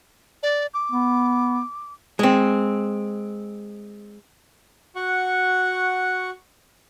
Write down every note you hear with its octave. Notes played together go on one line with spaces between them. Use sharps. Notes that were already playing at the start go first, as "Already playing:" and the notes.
D5
D6
B3
G#3 C4
F#4 F#5 C#6